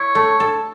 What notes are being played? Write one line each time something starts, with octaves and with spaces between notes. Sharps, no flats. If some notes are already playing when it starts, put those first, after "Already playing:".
Already playing: E4 C#5
A3
A4